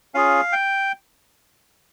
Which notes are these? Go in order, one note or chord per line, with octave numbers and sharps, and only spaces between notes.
C#4 F4 G#4 F5
G5